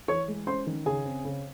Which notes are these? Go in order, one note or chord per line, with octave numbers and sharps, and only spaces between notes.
E3 C#5 C#6
G#3
C#4 C5 C6
D#3
C#3 G#4 G#5
C4
C#3